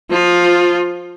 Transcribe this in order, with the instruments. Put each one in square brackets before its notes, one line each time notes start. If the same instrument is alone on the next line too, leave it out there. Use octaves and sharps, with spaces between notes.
[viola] F3 F4